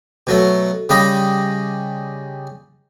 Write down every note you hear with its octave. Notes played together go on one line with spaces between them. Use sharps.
B2 F#3 A3
C#3 G3 D#5 B5 D#6